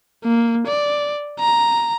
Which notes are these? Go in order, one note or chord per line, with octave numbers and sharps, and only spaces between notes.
A#3
D5
A#5